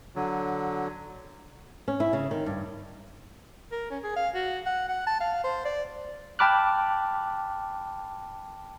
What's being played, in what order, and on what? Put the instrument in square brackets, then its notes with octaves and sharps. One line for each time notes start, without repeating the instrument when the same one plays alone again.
[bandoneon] D3 F#3
[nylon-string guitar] C#4
E4
C#3
D#3
G2
[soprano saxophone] A#4
C#4
G#4
F5
F#4
F#5
F#5
A5
F5
C5
D5
[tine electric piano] G5 A5 B5 D6 F6 F#6